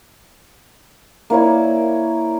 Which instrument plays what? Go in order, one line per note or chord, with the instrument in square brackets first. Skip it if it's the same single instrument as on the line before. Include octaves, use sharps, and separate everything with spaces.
[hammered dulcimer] A#3 E4 C#5 D5